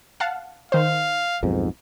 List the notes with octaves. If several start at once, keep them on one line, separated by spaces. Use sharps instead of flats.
F5 F#5 A5
D#3 C5 F5
B1 F2 G#2